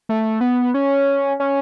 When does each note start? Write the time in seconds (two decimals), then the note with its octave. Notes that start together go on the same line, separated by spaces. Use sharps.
0.09 A3
0.41 B3
0.74 C#4
1.40 C#4